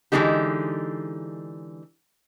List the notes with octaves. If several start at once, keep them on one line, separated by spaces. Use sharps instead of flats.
D3 E3 G#3 A3 D#4 G4